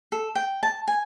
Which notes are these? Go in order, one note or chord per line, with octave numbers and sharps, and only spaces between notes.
A4
G5
A5
G#5